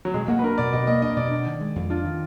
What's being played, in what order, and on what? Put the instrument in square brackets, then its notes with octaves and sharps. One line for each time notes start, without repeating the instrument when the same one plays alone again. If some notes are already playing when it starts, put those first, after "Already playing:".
[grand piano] F#3
[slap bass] B2 [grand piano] G#3
[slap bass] A#3 [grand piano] F#4
[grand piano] B4
[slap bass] D4 [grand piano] A#4
[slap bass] B2 [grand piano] D5
[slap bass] B2 [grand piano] D#5
[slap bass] A#3 [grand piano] D#5
[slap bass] D4 [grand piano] D#5
[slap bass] B2 [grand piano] D5
[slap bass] D4
D#3
G#3
F2
[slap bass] D4 [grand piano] F4
[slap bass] D#3